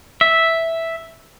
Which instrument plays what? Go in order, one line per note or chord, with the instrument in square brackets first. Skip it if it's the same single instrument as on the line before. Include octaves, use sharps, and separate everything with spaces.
[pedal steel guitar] E5